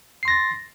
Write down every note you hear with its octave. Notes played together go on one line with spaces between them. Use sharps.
C6 A6 A#6 C7